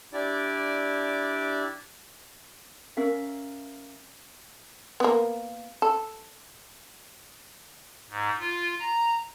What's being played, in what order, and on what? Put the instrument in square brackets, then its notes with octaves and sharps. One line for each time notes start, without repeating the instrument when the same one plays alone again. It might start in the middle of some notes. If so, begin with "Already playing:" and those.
[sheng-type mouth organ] D4 E4 G4 D5
[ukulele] C#4 A#4 E5 F5
[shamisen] A#3 B3
A4
[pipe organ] G#2
F4
A#5